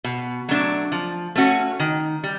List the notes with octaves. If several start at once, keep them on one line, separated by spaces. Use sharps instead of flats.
B2
F#3 A3 D4
F3
A3 C#4 F#4
D#3
G3